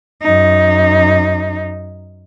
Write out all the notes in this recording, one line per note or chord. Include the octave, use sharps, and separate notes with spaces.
F#2 D#4